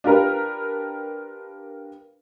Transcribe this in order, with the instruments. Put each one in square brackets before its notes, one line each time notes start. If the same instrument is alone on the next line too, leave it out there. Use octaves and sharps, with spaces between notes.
[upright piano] D4 F4 G4 A#4 B4